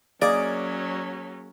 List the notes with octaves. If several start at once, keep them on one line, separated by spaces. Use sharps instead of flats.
F#3 A#3 C#4 G#4 D5 D#5